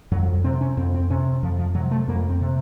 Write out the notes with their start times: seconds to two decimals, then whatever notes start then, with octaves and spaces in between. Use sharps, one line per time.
0.11 F2 F#3
0.44 C3 C4
0.61 C#4
0.77 F2 C4
0.94 C4
1.10 C3 C#4
1.43 F2 F3
1.59 F3
1.75 C3 F#3
1.91 A3
2.08 F2 A#3
2.30 C4
2.41 C3